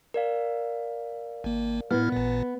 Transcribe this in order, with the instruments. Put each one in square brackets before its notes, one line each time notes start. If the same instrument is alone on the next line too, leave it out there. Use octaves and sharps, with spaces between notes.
[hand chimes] A#4 D5 F5
[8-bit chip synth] G#1 A#3
[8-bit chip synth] A2 E4 F6 [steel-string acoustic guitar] B3
[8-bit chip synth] A1 A#2